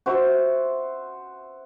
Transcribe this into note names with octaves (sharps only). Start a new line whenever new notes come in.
F#4 C5 E5